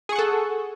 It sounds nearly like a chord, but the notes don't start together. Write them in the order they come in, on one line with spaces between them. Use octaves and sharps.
G#4 C#6 F#5 A4